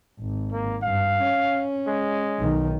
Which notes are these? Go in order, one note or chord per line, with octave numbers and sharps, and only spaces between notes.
G#1
A#3
G2 F5
C#4
G#3
B1 D#3